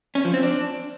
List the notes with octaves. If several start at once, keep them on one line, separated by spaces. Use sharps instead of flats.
C#4
F3
C4
D4